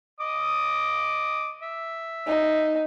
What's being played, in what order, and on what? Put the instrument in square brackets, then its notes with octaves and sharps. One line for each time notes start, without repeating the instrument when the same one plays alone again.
[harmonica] D#5 D6 D#6
E5
[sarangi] D#4